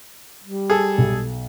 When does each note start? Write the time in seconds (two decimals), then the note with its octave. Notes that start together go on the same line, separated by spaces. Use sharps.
0.44 G3
0.70 G#4 A4
0.98 B1